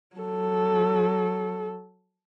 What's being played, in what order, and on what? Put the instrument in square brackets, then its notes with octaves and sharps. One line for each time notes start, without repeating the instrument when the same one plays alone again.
[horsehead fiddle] F#3 A4